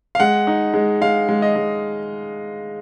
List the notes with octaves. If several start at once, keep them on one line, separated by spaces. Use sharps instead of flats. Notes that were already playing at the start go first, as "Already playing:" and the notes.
F5
G#3 F#5
D#4
G#3
G#3 F5
G#3
D#5
G#3